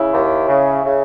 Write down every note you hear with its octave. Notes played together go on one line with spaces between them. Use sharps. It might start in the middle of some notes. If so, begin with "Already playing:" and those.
Already playing: C#3 E4
D#2
C#3
C#3